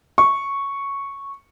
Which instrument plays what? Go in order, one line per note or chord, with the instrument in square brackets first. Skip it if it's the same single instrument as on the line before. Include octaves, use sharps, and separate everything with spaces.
[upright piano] C#6